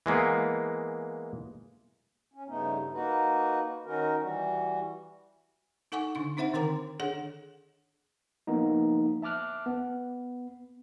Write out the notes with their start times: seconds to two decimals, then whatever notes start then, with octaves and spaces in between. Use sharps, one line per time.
0.06 E3 G#3 A#3 B3
2.34 C#4
2.48 G2 C#3 A3 B3 D#4
2.93 A#3 D#4 F#4 B4
3.86 D#3 C#4 D#4 F#4 A#4
4.21 E3 G3 F#4
5.92 D#4 A4 F#5 G#5 C#6 D6
6.15 D3 D4 C#6
6.37 C4 D#4 C5 E5 F#5 B5
6.53 D3 D#3 A#4 G5 A#5 D6
7.00 D4 G#4 A4 C#5 F#5
8.47 F3 A#3 B3 D#4
9.22 E5 A5 D6 F6 F#6
9.66 B3